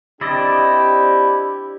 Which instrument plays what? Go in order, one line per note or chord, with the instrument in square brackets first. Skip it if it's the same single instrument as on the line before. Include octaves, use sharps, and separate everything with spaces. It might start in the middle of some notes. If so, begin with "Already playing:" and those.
[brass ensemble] C4 D4 G4 [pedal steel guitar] E4 D5 D#5